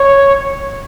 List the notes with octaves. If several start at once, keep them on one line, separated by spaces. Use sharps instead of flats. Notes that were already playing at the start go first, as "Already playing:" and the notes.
Already playing: C#5